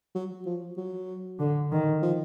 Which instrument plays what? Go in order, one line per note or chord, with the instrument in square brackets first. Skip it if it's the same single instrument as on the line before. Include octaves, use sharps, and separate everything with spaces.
[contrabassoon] F#3
F3
F#3
[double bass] D3
D#3
[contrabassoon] F3